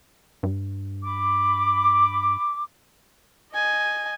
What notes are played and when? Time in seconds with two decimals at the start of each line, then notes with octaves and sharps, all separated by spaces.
0.43 G2
1.04 B5 D6
3.53 D#5 G#5